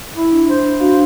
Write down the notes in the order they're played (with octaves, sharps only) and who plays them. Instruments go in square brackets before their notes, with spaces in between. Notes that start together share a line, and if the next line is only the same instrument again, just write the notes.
[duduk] E4
[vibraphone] D4
[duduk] C5
[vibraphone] D4 F#4 F5